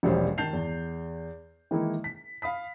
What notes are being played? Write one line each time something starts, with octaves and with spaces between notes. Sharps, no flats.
E1 A#1 B2 G3 C#4 C5
D#3 A5 G6 C7 F7
E2
D#3 E3 G#3 A#3 D#4 E4
B6
F5 B5 D#6 B6